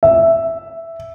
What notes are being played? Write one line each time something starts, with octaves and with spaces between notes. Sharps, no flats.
E5